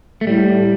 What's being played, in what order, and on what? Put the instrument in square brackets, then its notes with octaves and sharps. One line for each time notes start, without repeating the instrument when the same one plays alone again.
[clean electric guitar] A3
[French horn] A2 [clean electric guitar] G3